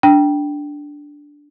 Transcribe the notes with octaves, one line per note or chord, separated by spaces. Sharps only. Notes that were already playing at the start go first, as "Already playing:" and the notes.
D4 G5